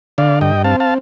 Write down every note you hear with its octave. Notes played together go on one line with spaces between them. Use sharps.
D3 D5 F5
G2 D#5 G5
C4 F5 A5
F5 A5